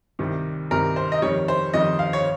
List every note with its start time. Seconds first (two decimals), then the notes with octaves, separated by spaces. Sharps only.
0.19 C2 C3 D#3 G3
0.71 C2 C3 D#3 G3 A#4
0.96 C5
1.12 D#5
1.22 F2 D#3 G3 C#5
1.48 C5
1.73 F2 D#3 G3 D#5
1.99 F5
2.13 C#5